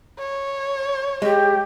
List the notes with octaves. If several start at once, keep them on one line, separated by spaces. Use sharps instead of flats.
C#5
G#3 G4